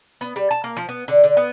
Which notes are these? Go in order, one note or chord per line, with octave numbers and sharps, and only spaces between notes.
B3
G3
A5
A#3
F3
B3
D3
D3
B3